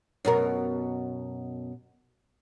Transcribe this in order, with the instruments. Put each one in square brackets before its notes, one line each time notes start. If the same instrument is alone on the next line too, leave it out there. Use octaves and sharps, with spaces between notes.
[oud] F#2 B2 A#4